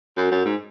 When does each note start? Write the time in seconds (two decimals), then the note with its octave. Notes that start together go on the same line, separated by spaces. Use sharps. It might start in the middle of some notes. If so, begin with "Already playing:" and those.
0.17 F#2
0.31 F#2
0.45 G#2